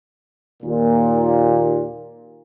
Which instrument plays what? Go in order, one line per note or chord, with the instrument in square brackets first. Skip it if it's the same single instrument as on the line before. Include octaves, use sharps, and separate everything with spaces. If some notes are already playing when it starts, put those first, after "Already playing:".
[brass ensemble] D#2 A#2